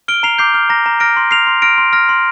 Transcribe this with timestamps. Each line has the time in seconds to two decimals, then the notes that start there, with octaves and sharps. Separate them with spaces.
0.08 F6 D7 G7
0.23 A#5 C7 F7
0.38 D6 G6 C7
0.54 F6
0.69 A#5 A#6
0.86 A#5
1.00 F6 A#6 D7
1.17 C6
1.31 F6 C7 F7
1.47 C6
1.62 F6 A#6 D7
1.78 C6
1.93 F6 A#6
2.09 C6